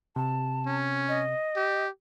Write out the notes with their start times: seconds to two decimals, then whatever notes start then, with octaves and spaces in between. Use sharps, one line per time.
0.16 C3 A5
0.66 C#4
1.09 D#5
1.56 G4